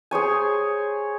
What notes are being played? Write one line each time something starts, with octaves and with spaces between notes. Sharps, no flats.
G#4 C5 C#5 G#5